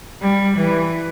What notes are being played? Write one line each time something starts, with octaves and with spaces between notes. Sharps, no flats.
G3
E3